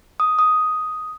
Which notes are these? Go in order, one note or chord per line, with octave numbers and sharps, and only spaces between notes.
D#6
D#6